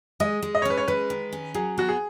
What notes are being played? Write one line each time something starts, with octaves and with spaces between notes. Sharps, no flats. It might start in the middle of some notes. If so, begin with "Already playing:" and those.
G#3 D#5
G#3
D#5
C#5
C#4 B4
C#5
G#3 B4
D#3
C#4
F#3 G#4
B3 F#4
G#4